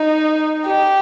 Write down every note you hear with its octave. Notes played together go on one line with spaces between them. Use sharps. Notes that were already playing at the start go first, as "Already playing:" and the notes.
Already playing: D#4
G4